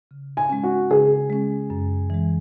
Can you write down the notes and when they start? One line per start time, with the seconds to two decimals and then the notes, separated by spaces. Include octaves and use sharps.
0.11 C#3
0.37 G#5
0.50 G#3 C#4
0.63 F#4
0.90 C#3 G#4
1.30 G#3 C#4
1.70 F#2
2.10 E3 G#3